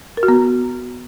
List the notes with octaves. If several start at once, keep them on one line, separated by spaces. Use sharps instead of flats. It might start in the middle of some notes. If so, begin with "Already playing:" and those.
A#4
F#4
B3